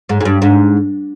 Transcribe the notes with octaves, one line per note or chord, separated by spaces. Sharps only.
G#2
G#2
G2
G#2